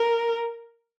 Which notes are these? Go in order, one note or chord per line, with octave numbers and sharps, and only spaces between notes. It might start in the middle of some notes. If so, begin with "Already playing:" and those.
Already playing: A#4